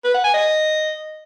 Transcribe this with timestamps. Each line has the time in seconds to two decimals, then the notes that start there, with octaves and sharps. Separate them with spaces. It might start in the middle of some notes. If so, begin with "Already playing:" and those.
0.04 B4
0.14 F#5
0.24 G#5
0.34 D#5